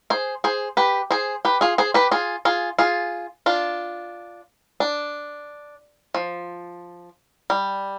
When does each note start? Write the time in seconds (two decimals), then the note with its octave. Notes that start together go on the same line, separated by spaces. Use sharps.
0.10 G#4 C5
0.44 G#4 C5
0.77 G4 B4
1.11 G#4 C5
1.45 G4 B4
1.61 F4 G#4
1.78 G#4 C5
1.94 G4 B4
2.11 F4 G#4
2.45 F4 G#4
2.79 F4 G#4
3.46 D4 F4
4.80 D4
6.14 F3
7.50 G3